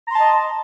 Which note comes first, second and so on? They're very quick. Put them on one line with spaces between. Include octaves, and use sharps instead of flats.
A#5 C6 A5 D#5